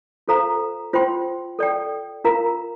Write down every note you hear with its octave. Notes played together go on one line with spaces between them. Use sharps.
F4 A4 C5 F5 A#5
F4 C5 G5 C6
A4 D5 G5
F4 A#4 F5 A#5